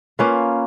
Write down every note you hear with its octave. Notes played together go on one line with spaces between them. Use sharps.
A#3 C#4 F4 B4